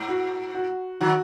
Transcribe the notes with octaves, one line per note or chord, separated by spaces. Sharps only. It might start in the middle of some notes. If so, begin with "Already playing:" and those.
Already playing: G#2
F#4
F#4
D#3 F#3 F#4